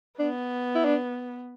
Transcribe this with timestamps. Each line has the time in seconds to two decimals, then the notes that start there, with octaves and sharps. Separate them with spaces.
0.19 B3 D4
0.75 E4
0.85 D4